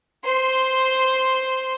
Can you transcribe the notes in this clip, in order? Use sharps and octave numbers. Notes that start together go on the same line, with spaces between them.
C5 C6